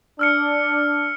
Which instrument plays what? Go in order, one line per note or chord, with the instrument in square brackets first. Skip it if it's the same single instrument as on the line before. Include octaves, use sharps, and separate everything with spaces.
[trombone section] D4 [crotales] E6 F6 C#7